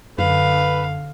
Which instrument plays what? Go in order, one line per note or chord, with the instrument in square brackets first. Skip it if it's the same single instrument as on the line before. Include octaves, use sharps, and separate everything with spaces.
[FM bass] F#2 [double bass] D3 [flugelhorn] B4 [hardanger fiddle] F5